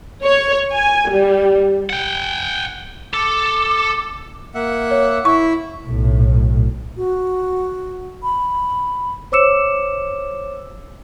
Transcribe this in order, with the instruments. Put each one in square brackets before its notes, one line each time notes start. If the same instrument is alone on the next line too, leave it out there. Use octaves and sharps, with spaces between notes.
[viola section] C#5
G#5
G3
[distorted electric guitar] F#5 G5
[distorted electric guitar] A4 [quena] D6
[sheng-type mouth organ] A#3 E5 F#5
[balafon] C#5
[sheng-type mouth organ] E4 [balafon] C#6
[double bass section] B1 A2
[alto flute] F#4
B5
[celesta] C5 C#5 D6 E6 C#7 E7